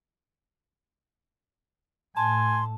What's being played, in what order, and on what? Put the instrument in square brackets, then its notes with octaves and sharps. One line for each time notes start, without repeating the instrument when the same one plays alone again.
[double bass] A2 [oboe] G#5 [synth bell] A5 [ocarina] C6